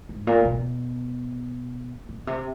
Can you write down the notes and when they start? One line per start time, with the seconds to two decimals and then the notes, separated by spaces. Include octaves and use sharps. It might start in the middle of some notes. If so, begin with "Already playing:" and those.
0.09 G#2
0.27 A#2
0.45 B2
2.09 B2
2.27 C3